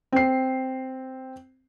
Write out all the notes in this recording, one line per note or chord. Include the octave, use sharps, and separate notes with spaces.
C4 C7